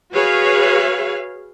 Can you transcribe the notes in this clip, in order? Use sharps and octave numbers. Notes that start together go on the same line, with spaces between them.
F#4 G#4 B4 C#5 F5